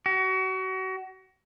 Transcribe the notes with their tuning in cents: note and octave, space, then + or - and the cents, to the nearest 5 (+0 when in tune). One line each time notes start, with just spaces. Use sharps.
F#4 +30